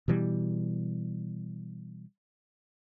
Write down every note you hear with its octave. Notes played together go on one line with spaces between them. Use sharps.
B2 E3 G3